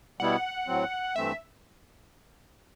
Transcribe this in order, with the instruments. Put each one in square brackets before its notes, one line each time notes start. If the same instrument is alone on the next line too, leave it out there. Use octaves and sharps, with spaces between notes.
[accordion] B2 G3 B3 E4 [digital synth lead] F#5
[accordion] A2 F#3 C4
[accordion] G2 E3 A3 C4 [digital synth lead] E5